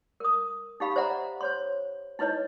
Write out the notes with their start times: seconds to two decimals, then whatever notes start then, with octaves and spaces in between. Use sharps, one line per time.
0.20 A#4 D#6
0.80 D#4 G4 F5 B5
0.96 C5 D5 E5 F#5 A#5
1.41 C5 C#5 C6
2.19 D#4 E4 B4 C#5 D#5